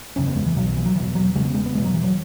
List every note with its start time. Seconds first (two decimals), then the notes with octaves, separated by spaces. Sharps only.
0.16 F#1 E2 C#3 C#4
0.27 B3
0.36 G#3
0.47 E3
0.57 B1 B2 F#3
0.77 E3
0.86 F#3
0.96 E1 E2 B2 E3
1.15 F#3
1.35 E1 E2 C#3 G#3
1.45 B3
1.55 G#3
1.66 B3
1.75 E1 E2 B2 G#3
1.85 F#3
1.94 E3
2.04 F#3